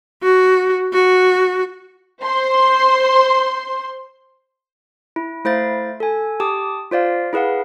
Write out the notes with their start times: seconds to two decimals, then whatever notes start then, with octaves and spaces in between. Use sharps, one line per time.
0.23 F#4
0.93 F#4
2.23 C5 C6
5.16 E4
5.45 A3 E4 C5 F5 A6
6.00 A4 G#5
6.40 G4 A5 D6 D#6
6.91 F4 C5 D5 F5
7.33 E4 G#4 B4 F5 F#5